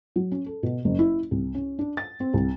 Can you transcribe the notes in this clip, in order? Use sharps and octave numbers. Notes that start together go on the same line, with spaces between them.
F#3
C#4
A4
B2
F#1
E4
C2
C#4
D4
A6
C4
C2